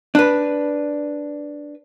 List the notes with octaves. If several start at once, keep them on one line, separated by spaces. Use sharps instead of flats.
D4 B4